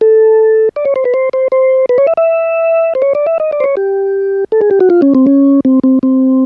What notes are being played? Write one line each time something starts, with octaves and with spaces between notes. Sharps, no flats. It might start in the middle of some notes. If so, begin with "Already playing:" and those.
A4
D5
C#5
C5
B4
C5
C5
C5
B4
C#5
E5
E5
C5
C#5
D5
E5
D#5
D5
C5
C#5
G4
A4
G#4
G4
F#4
F4
C#4
C4
C#4
C4
C4
C4